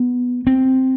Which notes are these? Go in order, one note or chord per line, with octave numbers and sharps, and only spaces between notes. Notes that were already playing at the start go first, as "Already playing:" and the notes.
Already playing: B3
C4